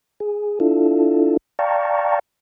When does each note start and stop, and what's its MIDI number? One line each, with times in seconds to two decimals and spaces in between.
0.20 0.59 68
0.60 1.37 62
0.60 1.37 64
0.60 1.37 65
0.60 1.37 69
1.59 2.19 74
1.59 2.19 77
1.59 2.19 79
1.59 2.19 81
1.59 2.19 82
1.59 2.19 85